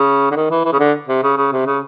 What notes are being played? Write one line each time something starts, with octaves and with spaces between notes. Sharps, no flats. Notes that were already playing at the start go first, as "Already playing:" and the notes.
Already playing: C#3
D3
D#3
E3
E3
C#3
D3
C3
C#3
C#3
C3
C#3